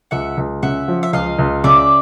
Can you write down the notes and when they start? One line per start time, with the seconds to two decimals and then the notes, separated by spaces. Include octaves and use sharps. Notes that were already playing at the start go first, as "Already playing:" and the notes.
0.11 C#2 E5 F#5
0.37 C#2
0.63 C#3 E5 F#5
0.88 F3
1.03 E5
1.13 C#2 D#5 F5
1.39 C#2
1.64 C#3 D5 E5